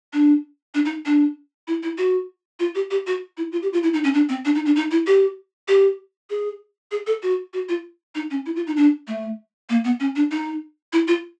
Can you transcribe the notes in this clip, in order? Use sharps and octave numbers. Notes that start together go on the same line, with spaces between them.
D4
D4
D#4
D4
E4
E4
F#4
F4
G4
G4
F#4
E4
F4
G4
F4
E4
D#4
C#4
D4
C4
D4
D#4
D4
D#4
E4
G4
G4
G#4
G#4
A4
F#4
F#4
F4
D#4
C#4
E4
F4
D#4
D4
A3
A#3
B3
C#4
D4
D#4
E4
F4